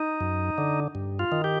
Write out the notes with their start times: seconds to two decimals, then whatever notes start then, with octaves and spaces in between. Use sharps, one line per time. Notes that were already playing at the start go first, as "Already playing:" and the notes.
Already playing: D#4
0.21 F#2
0.58 D3
0.95 G2
1.19 F4
1.32 D#3
1.44 G4